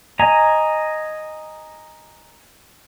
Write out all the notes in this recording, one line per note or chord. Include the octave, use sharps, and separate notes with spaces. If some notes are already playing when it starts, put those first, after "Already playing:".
D#5 G#5 A#5